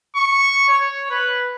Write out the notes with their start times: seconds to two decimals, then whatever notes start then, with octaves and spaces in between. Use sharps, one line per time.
0.16 C#6
0.68 C#5
1.10 B4